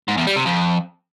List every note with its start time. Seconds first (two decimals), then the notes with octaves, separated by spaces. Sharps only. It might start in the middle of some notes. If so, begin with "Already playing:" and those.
0.08 G#2
0.17 E2
0.27 G3
0.36 C3
0.45 F2